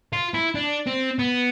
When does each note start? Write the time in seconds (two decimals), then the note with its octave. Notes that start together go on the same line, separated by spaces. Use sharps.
0.13 F4
0.34 E4
0.55 D4
0.87 C4
1.19 B3